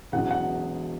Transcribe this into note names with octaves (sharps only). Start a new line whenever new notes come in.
E1 E2 C#3 F#3 F#5
F#5